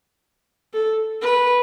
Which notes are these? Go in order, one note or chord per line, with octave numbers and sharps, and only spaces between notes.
A4
B4